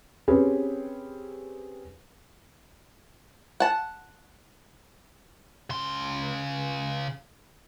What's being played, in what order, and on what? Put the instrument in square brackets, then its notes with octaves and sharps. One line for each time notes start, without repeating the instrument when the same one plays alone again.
[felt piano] C4 C#4 G4 G#4 B4
[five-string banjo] F#5 A5
[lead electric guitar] C#3 C6